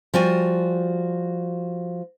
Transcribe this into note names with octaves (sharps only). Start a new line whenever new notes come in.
F3 G3 F#4 G#5